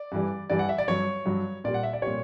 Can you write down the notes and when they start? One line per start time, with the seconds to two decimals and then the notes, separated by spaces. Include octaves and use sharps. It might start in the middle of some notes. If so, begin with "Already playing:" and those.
Already playing: D5
0.12 G2 E3 G3
0.50 G2 E3 G3 D5
0.59 F#5
0.69 E5
0.78 D5
0.88 G2 F#3 C#5
1.26 G2 F#3
1.64 A#2 G3 D5
1.74 F#5
1.83 E5
1.93 D5
2.02 A#2 G3 C#5